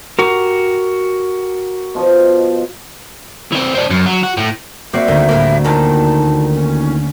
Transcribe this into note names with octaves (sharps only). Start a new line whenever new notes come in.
F#4 G4 A#4
B2 F3 D#5
E3 C4
C4 D4
F#2
F#3
F#4
A2
A#3 C4 F#4 D5 E5
D2 D#3
A2 G3 A#3
D#2 A#2 D#3 A5
C#4